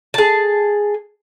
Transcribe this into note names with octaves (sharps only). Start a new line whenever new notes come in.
G#4 A5